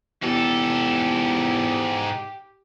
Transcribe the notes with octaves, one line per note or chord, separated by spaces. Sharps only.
E2 G#2 G4 A4